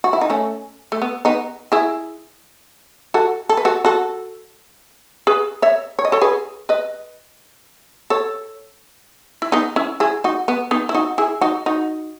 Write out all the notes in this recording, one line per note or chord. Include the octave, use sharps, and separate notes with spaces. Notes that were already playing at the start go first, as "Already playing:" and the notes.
F#4
E4
D#4
A3 C#4
A3
B3
B3 D#4
E4 G#4
F#4 A4
A4
B4
F#4 A4
F#4 A4
G#4 B4
C#5 E5
C#5
D#5
A4 C#5
G#4 B4
B4 D#5
A4 C#5
E4
B3 D#4
C#4 E4
E4 G#4
D#4 F#4
B3
B3 D#4
E4
D#4 F#4
E4 G#4
D#4 F#4
D#4 F#4